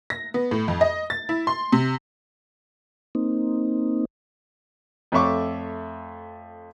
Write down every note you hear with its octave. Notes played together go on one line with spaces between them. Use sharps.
A#6
B3
A2
F2
D#5
A6
E4
C6
C3
A#3 C4 D#4
F2 A3 C#5 E5 C#6 D6